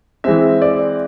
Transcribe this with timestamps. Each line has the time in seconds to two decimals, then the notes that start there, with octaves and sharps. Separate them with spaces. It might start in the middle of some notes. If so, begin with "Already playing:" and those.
0.24 E3 G#3 C4 E5
0.62 D5